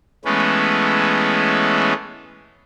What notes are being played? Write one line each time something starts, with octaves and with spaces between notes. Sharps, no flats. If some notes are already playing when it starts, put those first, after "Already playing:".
E3 G#3 A3 B3 C#4